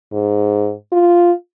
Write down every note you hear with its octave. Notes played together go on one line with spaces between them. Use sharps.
G#2
F4